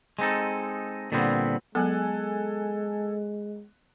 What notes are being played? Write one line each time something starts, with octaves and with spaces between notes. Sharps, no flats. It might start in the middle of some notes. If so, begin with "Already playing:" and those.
G#3 C4 D#4 A4
A#2 D3 G3 B3 C4
F#3 G#3 B3 A4 G#5 F#6